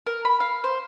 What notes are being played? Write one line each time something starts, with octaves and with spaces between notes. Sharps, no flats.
A#4
B5
F5
C5